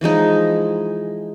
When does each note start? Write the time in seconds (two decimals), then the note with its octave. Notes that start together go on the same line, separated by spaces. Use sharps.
0.01 E3 F3 G#3 D#4